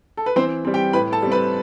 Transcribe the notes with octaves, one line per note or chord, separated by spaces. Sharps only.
A4
B4
E3 C4 C5
G3 C4
G4 G5
A2 B4 B5
A4 A5
G3 C4
B4 B5